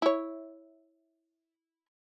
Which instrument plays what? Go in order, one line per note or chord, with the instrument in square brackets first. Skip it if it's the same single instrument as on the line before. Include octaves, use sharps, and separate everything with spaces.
[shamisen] E4 C#5